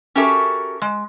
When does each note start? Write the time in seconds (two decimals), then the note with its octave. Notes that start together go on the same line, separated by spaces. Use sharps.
0.15 C#4 F#4 G4 A4 A#4 E5
0.82 G#3